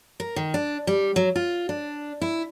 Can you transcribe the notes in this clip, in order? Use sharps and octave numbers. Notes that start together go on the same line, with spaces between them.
A#4
D#3
D4
G3
F#3
F4
D4
E4